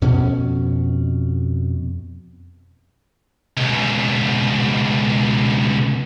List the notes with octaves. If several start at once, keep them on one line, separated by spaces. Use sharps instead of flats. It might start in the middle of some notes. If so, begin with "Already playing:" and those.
F2 B2 C#4
C#2 B2